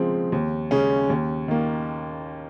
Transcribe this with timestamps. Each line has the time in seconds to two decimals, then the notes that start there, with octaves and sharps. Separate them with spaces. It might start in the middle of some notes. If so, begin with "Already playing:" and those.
Already playing: C#3 F3 G#3 C4
0.32 D#2
0.71 C#3 G#3 C#4
1.10 D#2
1.48 D#3 A#3